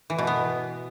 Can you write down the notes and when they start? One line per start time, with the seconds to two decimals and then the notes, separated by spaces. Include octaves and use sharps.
0.10 E3
0.18 B2
0.27 B3